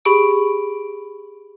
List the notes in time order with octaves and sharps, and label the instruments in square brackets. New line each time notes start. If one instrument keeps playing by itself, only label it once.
[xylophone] G4 G#4 B5 C#6 D7